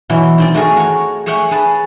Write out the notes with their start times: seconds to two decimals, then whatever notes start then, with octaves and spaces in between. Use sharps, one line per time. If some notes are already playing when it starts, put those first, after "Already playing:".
0.10 B2 E3 F#3
0.38 D#3 C4 D5
0.55 A3 F#4 G#4 A#4
0.77 F#4 C#5
1.26 G#4 C#5 E5 F#5 G5
1.51 G#4 B4 A5